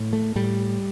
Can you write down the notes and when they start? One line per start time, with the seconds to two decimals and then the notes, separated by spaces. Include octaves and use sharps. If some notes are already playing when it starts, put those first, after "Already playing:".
Already playing: A2
0.13 A3
0.35 A2 G3